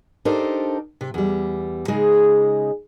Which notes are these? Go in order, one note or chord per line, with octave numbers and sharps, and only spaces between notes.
D4 D#4 G4 A4 A#4 C5
C3
E2 G3
C#3 G#3 D#4 G#4